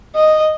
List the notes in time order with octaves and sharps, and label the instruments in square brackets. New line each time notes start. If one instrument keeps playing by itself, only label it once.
[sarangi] D#5